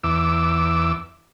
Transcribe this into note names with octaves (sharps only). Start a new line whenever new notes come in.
E2 D6 E6